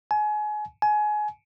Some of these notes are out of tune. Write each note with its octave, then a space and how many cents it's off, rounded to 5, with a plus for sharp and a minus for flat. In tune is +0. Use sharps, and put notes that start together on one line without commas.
G#5 +30
G#5 +25